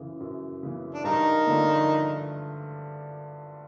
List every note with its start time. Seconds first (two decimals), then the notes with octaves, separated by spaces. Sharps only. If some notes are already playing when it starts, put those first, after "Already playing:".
Already playing: F#2 C#3 E3
0.20 F#2
0.63 C#3 E3
0.94 D4
1.04 G2 D#3 D#4
1.46 D3 F3 A3 D4